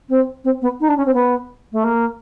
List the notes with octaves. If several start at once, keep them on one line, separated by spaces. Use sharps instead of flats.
C4
C4
B3
D#4
D4
C#4
C4
B3
A3
A#3